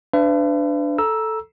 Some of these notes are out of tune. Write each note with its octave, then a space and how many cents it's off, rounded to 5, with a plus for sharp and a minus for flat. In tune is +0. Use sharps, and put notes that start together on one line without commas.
D4 +0 B4 +40 E5 +45
A4 +0 A#5 +20 E6 +0